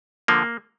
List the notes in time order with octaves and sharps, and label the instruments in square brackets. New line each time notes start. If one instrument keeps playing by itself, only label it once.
[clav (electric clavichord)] D3 F3 A#3